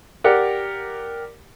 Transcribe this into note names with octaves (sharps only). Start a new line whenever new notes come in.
G4 A#4 D5 F#5